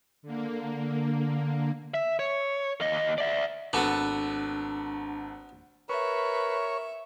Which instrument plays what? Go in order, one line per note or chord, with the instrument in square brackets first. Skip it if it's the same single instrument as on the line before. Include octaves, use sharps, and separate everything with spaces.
[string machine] D3 A#3
[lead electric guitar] E5
C#5
D#2 D#5
D5 E5
[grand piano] G#1 A4 [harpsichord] B3 F#4 B4 [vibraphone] D4
[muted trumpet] A#4 [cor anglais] B4 [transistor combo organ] C#5 [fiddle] E5